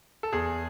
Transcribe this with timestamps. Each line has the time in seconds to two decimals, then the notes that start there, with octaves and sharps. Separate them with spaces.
0.23 A4
0.33 E2 G#4